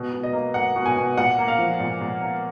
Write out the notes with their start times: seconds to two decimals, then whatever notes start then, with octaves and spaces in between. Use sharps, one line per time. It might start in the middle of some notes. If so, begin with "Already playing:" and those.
Already playing: B2
0.12 B2
0.23 D#5
0.33 A#3
0.54 A#3 F#5
0.76 B2
0.86 G#5
0.97 B2
1.18 A#2 F#5
1.38 A#3
1.48 F5
1.58 F3
1.80 A#2
2.01 A#2
2.21 A#3